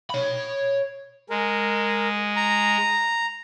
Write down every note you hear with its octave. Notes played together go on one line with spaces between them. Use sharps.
C#5 B5
G#3 A#4
A#5